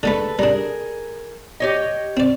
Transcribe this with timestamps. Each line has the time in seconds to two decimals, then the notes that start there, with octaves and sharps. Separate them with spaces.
0.03 D3 G#3 A3 A4 B4
0.39 G3 D4 G#4 A#4
1.60 G4 C#5 D#5
2.17 C4 D5